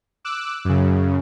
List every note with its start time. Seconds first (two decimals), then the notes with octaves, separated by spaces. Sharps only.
0.25 D6 E6 F#6
0.65 F#2 C#3